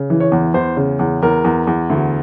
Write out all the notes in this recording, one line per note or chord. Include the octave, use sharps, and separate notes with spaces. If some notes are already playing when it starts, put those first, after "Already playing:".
Already playing: C#3
E3
C#5
E2
E2 C5
C#3
E2
E2 A#4
E2
E2
D2